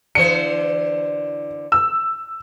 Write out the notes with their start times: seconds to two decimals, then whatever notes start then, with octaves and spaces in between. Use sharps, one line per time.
0.15 D3 E3 C5 C#7
1.72 E6